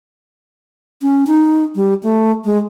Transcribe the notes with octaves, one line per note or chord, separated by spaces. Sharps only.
C#4
D#4
G3
A3
G#3